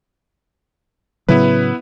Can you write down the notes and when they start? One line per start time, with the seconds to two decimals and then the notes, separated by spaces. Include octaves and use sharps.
1.28 A2 C#3 F#3 B3 E4 B4